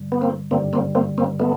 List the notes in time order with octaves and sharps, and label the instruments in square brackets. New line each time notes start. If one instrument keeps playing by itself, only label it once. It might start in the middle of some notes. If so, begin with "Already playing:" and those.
Already playing: [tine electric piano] G#1 G2 D3 G3
[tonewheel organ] B3
A#3 C4
[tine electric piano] G#1 G2 D3 G3 [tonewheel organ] A#3 C4
[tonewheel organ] A#3 C4
A#3 C4
A#3 C4
A3 B3